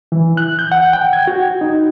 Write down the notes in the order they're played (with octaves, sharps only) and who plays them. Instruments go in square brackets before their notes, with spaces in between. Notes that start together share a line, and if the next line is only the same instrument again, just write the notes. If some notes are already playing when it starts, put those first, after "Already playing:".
[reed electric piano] E3
F#6
G6
F#5
G5
G#6
F#4
D#4